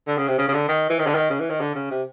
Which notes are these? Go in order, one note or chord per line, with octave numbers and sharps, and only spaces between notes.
D3
C#3
C3
C#3
C#3
D3
D#3
E3
D#3
D3
D#3
C#3
E3
D#3
D3
C#3
C3